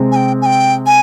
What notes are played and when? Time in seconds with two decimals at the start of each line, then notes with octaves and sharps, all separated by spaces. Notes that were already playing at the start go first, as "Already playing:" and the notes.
Already playing: C3 G#3 C4
0.11 G#5
0.16 G5
0.41 G#5
0.46 G5
0.86 G#5